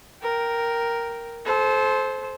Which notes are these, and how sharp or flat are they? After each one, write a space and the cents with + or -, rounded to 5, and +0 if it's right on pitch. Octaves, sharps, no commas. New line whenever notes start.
A#4 +0 G5 -5
A4 -35 C5 +0